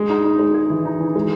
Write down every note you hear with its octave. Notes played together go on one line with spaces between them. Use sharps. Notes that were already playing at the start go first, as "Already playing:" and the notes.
Already playing: G#3
D#4
D#4
G#3
G#4
E3
D#4
E3
G#3